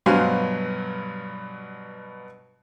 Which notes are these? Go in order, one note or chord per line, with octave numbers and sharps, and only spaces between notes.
G2 B2 F#3 C5 F5 G#5